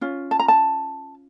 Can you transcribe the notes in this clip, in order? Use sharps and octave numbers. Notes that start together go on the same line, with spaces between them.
C#4 F4
A5
A#5
A5